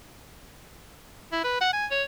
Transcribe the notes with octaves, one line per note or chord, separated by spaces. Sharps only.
E4
B4
F#5
G#5
C#5